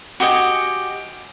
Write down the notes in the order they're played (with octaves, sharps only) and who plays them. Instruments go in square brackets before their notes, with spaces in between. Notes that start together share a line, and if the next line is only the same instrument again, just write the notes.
[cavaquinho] F#4 G4 D#5 G#5